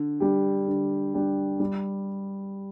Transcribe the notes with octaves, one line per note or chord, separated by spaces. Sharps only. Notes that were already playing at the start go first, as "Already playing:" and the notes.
Already playing: D3
G3 D4 G4
D3
G3 D4 G4
G3